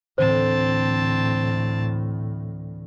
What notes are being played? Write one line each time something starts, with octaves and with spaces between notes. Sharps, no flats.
D2 A2 D3 E3 C4 C5 A5